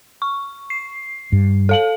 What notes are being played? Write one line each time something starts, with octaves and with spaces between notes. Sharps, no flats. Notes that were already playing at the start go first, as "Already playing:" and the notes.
C#6
C7
G2
A4 F5 F#7